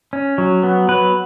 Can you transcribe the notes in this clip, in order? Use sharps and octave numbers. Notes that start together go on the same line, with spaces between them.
C#4
F#3
B3
F#3 B4